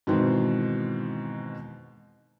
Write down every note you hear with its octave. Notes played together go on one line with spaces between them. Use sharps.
G#2 B2 D#3 E3 C4